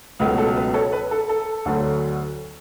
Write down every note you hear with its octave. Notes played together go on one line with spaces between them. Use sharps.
C#2 B2 F#3 A3 B4
A4
B4
A4 C#5
B4
A4
A4
D2 D3 F#3 A3